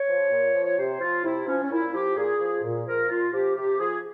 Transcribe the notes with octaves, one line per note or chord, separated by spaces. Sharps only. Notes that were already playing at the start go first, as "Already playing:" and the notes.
Already playing: C#5
F3
A#2
F3
C#5
C3 C5
F3 F4
C3 E4
F3 C#4
C#4
A#2 E4
F3 G4
A#2 G#4
F3
A#2
F3 A#4
A#2 F4
F3 G4
C3 G4
F3 G#4